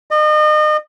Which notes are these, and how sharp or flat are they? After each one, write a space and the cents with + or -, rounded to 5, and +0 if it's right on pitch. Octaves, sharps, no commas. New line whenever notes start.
D#5 -35